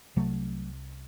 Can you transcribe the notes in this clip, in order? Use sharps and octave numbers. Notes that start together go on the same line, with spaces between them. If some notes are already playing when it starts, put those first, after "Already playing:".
C2 C3 F#3 A3